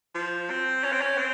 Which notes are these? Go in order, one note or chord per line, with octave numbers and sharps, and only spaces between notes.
F3
C4
C#4
C4
C#4
C4